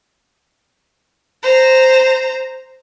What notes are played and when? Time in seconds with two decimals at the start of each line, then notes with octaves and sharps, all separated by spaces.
1.43 C5 A#5